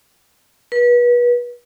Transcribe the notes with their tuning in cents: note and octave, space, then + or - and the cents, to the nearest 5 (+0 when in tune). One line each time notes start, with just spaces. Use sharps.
B4 -30